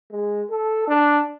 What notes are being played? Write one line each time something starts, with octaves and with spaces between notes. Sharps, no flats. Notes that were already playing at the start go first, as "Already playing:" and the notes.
G#3
A4
D4